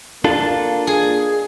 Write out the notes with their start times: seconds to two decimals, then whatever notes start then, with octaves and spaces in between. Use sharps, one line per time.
0.24 A#3 D4 F4 A4
0.87 G#4